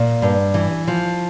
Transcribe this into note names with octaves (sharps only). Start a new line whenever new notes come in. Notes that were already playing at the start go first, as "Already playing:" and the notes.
Already playing: A#2
G2
E3
F3